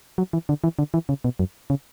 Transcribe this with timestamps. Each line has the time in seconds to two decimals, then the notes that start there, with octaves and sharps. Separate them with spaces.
0.18 F#3
0.33 E3
0.49 D3
0.64 E3
0.79 D3
0.94 E3
1.09 C#3
1.24 B2
1.39 F#2
1.70 C#3